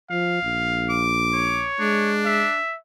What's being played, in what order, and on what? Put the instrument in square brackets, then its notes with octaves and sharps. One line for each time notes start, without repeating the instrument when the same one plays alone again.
[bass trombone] F3 [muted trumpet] F5
[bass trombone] A#1
[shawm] D6
[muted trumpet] C#5
[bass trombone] G#3 [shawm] D4
[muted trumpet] E5